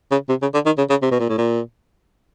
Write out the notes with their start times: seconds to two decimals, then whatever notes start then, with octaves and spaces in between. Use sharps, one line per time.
0.11 C#3
0.29 C3
0.42 C#3
0.54 D3
0.66 D#3
0.78 C#3
0.90 C#3
1.02 C3
1.11 B2
1.20 A#2
1.29 A2
1.38 A#2